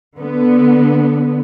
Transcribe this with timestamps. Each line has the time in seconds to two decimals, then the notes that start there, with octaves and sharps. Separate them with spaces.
0.17 D3 B3